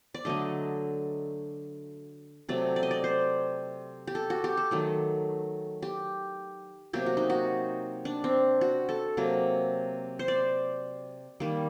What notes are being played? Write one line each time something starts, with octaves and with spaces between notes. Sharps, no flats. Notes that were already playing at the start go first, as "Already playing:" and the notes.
D5
D3 F#3 A3 D#5
C3 F#3 A3 D5
D5
D#5
D5
C5
G4
A4
F#4
G4
A4
D#3 F#3 A3
G4
C3 F#3 A#3 G4
F#4
D#4
F#4
D4
C4
F#4
A4
C3 F#3 A#3
C5
D5
D#3 G3 A#3